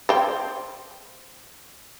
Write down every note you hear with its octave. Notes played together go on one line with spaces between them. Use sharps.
C5 G5